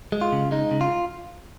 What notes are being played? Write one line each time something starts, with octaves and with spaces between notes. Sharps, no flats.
G#3
F4
C#3
G#3 D#4
C#3
F4